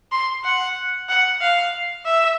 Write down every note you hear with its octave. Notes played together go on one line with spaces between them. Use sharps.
C6
F#5
F#5
F5
E5